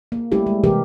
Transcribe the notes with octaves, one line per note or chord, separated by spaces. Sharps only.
A#3
G3 A3 C#4 E4 G4 A4
G#3
C3 E3 G4 A#4